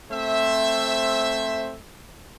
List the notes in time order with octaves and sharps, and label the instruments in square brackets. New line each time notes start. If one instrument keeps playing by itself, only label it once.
[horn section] A3 C4 C5 E5